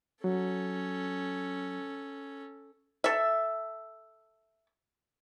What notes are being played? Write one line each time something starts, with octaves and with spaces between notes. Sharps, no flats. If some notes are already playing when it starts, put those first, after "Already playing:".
F#3 C#4 A4
A4 E5